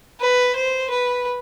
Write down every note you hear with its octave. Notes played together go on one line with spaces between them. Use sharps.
B4
C5
B4